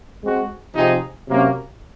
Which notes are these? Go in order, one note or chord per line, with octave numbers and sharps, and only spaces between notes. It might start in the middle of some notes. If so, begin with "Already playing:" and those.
G#3 C4 F#4
C3 F3 C4 D#4 G#4
C3 F#3 A#3 C#4